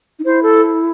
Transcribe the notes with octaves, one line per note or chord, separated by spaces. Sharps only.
D#4
E4 C5
A4